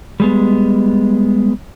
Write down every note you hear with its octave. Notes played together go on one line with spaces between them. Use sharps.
G3 G#3 B3